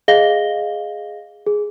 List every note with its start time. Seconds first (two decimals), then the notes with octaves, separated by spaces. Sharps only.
0.08 G#4 D#5 F5 A#6 G7
1.47 G#4